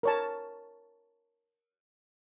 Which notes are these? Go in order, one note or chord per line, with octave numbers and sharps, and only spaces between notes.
A#4 C#5 A5